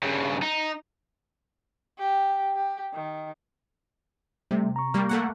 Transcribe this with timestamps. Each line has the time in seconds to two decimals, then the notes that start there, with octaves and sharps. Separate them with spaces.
0.03 G2 C#3
0.42 D#4
1.99 G4
2.55 G4
2.94 D#3
4.51 C3 G3 A3
4.76 A#5 C#6
4.94 G3 A#3
5.09 A3 A#3 F#5